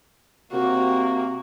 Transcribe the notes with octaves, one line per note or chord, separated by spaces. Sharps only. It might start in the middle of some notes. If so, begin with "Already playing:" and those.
C3 A#3 F#4